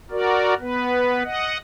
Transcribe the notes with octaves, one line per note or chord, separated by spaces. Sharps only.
F#4 A#4 D5
B3 B4
D#5 F#5